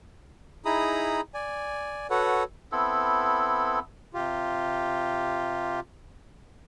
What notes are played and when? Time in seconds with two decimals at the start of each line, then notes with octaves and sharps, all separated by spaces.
0.65 D#4 E4 G#4 A#5 B5 D#6
1.34 D5 G#5
2.10 F#4 A4 B4 C#5 F#5
2.72 B3 C4 E4 A4
4.14 C3 F4 G4